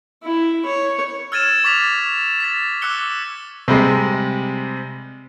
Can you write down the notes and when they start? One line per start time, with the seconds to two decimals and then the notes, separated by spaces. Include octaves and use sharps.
0.23 E4
0.66 C#5
1.32 E6 F6 G#6 A6 D#7 E7
1.64 C#6 D6 A6 B6 F7
2.40 A6 B6
2.82 D6 E6 F#6 C#7 G7
3.68 C3 G3 G#3